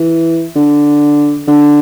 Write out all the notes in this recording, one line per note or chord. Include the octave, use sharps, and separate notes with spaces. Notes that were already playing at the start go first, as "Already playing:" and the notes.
Already playing: E3
D3
D3